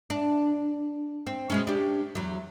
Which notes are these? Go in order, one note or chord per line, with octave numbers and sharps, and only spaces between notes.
D4
C4
B2 G#3 C#4
D4 G4
E2 F#3